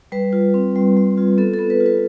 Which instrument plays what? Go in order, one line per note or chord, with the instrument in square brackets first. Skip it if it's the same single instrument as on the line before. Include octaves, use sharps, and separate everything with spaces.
[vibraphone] G3 B4
F4
C4
G3
G3
F4
B3 A4
A4
B3
B4
F4
B4